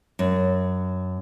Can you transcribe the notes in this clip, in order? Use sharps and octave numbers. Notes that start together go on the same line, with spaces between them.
F#2